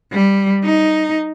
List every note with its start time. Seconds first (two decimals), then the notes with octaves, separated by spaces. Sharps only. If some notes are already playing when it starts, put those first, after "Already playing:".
0.12 G3
0.64 D#4